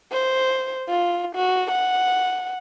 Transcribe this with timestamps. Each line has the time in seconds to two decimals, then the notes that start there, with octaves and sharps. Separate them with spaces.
0.12 C5
0.89 F4
1.35 F#4
1.71 F#5